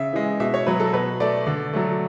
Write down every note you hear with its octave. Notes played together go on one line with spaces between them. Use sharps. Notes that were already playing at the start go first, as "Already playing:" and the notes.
Already playing: C#3 E5
E3 G#3
B2 E5
C#5
F#3 B3 B4
A4
B2 B4
A3 D5
D3
F#3 A3